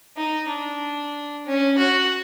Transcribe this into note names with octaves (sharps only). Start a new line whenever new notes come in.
D#4
D4
C#4
F#4